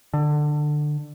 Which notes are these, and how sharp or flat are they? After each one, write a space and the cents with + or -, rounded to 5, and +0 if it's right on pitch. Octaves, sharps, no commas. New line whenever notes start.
D3 +20